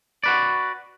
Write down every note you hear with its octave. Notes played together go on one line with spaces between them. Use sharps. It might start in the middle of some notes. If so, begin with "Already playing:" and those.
F#4 B4 D5